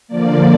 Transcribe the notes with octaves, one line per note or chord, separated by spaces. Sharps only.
D3 F3 A#3 D5